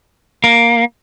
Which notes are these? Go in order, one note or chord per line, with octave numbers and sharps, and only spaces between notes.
A#3